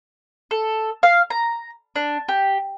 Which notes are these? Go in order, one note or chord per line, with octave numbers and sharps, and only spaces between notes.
A4
F5
A#5
D4
G4